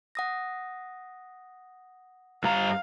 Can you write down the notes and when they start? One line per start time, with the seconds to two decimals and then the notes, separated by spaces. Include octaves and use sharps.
0.15 F#5 D#6 A#6
2.44 G2 F5 A#5